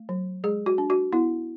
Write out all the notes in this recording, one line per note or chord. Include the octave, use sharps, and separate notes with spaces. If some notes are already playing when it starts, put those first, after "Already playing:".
Already playing: A3
F#3
G#3 G#4
F#4
D4
F#4
B3 E4